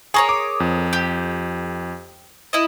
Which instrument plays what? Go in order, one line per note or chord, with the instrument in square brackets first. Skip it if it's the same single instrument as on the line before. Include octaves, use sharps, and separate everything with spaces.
[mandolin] G#4 A#4 C#5 [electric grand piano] G#5 C#6 D#6
[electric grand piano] D6
F2
[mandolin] G4
E4 D#5